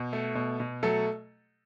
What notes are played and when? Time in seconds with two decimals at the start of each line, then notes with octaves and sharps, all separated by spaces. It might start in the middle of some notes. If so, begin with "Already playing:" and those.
Already playing: B2
0.13 A3
0.35 B2
0.60 B2
0.83 F#3 A3 A4